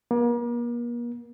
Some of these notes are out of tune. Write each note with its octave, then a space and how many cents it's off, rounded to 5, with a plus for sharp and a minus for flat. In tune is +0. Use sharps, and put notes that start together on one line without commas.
A#3 +40